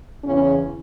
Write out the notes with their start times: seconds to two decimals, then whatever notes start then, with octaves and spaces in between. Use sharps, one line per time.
0.24 E2 C#3 E3 C#4